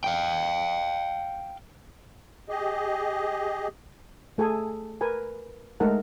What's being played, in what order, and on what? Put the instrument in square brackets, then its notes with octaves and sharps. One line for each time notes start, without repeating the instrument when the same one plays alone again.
[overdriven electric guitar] F5 G5
[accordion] G4 G#4 D#5
[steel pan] A3 G#4 A4 G#5
A#4 B4 G#5
G#3 A3 D#4 A#4 F#5 A5